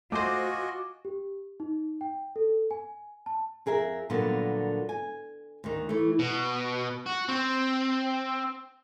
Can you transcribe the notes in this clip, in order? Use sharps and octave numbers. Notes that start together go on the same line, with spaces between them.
A3 F4 F#4 C5 D#5 G#5 D6
G4
D#4
G5
A4
G#5
A5
F2 G#4 A#4 E5
A#2 D3 F#3 G3 A#3 B3
G#5
D2 D#3
E3 A3
B2
F#4
C4